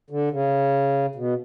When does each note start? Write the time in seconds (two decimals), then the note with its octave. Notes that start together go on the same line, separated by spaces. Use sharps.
0.10 D3
0.31 C#3
1.15 B2